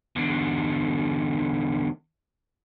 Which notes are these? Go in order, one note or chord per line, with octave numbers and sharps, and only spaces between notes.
E2 D3